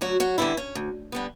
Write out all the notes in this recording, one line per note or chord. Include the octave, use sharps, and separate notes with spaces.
D2 F#3 F#4
F#3 F#4
D3 E3 G3 B3 E4
C#4
D2
D3 G3 B3